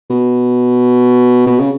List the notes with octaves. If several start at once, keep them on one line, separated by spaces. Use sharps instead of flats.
B2
B2
C#3